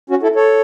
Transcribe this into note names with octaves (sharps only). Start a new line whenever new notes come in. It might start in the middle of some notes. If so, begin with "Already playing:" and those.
C#4 F#4
E4 A4
A4 C#5